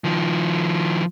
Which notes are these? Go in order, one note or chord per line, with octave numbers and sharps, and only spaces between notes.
D#3 F3